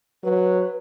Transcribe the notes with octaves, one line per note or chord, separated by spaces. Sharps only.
F#3 B4